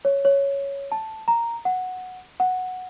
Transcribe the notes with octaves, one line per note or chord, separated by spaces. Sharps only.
C#5
C#5
A5
A#5
F#5
F#5